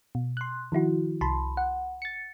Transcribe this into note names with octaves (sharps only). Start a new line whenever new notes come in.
B2
C6 F#6
D#3 F3 E4 F#4
C2 A5 B5 C6
F#5
A6 C#7